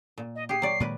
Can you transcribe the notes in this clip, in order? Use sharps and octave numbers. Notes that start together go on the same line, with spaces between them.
A#2
D#5
G4 G#4 C7
F#3 D5
A#2 D#3 G#3 B4 D5